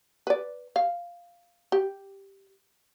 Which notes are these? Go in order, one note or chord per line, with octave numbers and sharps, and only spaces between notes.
B4 D5
F5
G4